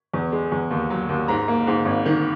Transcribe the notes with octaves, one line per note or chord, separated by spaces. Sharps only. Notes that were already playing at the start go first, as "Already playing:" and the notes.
E2
G#3
E2
D#2
F#3
D#2
G#2 A#5
A#3
G#2
G#1
D#3